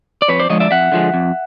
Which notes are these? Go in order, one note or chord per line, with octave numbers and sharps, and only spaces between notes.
D5
F2 B4 C#5
C5 D5
D3 F3 G#3 C#5 D#5
D5 E5
F2 E5 F#5
D3 F3 G#3
F2